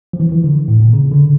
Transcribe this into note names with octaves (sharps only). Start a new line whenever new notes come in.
F3
E3
E3
D3
A2
A#2
C#3
D3